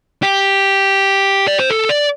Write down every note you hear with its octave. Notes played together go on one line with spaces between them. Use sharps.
G4
D5
C5
A4
D5